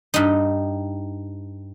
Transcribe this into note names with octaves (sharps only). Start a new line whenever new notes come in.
G2 D#4